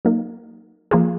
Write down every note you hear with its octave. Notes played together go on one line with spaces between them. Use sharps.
F#3 A#3 D#4
F3 A#3 F4 G#4